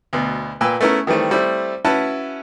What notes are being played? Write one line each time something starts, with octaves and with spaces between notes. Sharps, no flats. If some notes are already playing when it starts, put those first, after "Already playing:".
D2 B2
A#2 B4 G5 G#5 E6
A3 B3 C#4 E4 A#4
D#3 E3 G3 A3 C4
G3 A3 C4 E4
C#4 E4 F#4 B4 A5